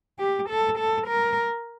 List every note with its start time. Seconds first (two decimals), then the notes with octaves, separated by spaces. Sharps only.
0.19 G4
0.49 A4
0.78 A4
1.08 A#4